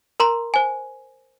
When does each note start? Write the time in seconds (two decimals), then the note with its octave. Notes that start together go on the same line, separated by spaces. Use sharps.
0.20 A#4 A#5 C6
0.54 C5 G#5